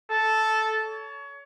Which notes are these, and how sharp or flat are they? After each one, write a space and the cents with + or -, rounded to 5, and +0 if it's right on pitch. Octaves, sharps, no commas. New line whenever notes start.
A4 -5
C#5 +25